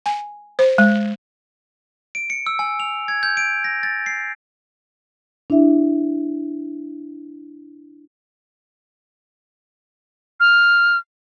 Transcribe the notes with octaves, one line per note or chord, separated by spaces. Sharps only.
G#5
C5
G#3
D7
C#7
E6
G#5
F7
G#6
G6
D7
A#6
A6
C7
D4 E4 G4 E5
F6